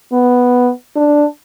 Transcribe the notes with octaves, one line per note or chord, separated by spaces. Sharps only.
B3
D4